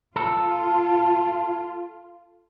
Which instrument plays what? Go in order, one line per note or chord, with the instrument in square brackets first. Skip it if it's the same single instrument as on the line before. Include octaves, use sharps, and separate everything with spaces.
[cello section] F4 [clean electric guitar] A4